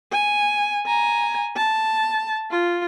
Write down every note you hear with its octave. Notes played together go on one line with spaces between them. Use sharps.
G#5
G#5 A#5
A5
F4